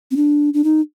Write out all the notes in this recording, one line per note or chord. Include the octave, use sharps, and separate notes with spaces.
C4
D4
D4
D#4